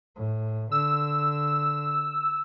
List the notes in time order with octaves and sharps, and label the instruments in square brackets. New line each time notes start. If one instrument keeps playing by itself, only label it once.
[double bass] A2
[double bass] D3 [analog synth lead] E6